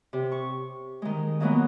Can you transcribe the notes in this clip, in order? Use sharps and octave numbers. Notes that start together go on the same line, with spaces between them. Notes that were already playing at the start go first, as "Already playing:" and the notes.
C3
C#6
D#3 G#3
A#2 D#3 F#3 G#3 A#3 B3